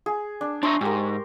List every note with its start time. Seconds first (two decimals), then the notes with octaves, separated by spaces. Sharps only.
0.06 G#4
0.41 D4
0.63 D4 E5 A#5 C6 C#6
0.81 G#2 G4 A#4